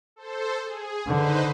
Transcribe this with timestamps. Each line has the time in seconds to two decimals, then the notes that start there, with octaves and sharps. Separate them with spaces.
0.16 A4 C5
0.64 G#4
1.07 D3 D#4 B4 C5